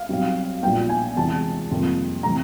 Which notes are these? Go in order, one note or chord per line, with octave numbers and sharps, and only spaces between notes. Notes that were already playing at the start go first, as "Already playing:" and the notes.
Already playing: F5
B1 B2 G3 C4
A#1 A#2 G3 B3 G5
G#5
E2 C3 E3 G#3 A5
F2 C3 D#3 G3 A#3
C3 E3 A3 C4 A#5